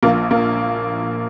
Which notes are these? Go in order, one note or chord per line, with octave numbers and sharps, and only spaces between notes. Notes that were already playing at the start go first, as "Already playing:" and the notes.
A#1 A#2 F3 A#3
A#3